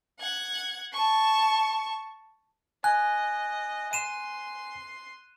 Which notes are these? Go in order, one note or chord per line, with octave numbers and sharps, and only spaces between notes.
F#5 G#6
A5 C#6
D#5 G#5 F#6
C6 D#7 E7